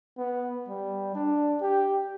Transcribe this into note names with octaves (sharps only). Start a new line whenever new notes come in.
B3
G3
D4
G4